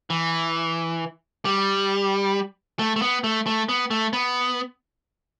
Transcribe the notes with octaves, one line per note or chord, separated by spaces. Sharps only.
E3
G3
A3
A3
B3
A3
A3
B3
A3
B3